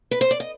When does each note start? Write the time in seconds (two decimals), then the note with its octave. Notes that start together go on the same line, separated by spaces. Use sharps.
0.11 B4
0.21 C5
0.31 D5
0.40 D#5